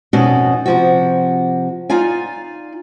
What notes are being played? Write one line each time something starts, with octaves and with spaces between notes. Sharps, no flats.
F2 B2 C#4 D#4 F#4 D5
C3 F3 F#4
D#4 F4 D5 F5 G#5